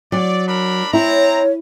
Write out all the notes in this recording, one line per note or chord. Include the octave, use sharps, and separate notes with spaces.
F#3 D5
D4 A#4 B5
C4 E4 C#5 A#5